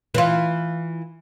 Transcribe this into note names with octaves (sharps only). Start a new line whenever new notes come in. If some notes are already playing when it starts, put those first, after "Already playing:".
E3 F4